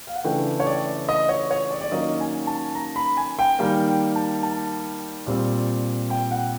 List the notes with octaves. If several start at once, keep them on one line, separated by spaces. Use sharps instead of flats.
F5
F#5
C#3 E3 A3 D4 G5
C#5
D5
D#5
C#5
C#5
D5
D5
D#3 F#3 A#3 C#4 D#5
G#5
A5
A#5
B5
G#5
G5
D#3 G3 A#3 G5
A5
A5
A#2 G3 C4
G5
F#5